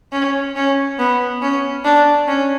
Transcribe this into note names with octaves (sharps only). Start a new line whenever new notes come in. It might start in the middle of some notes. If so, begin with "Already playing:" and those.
C#4
C#4
B3
C#4
D4
C#4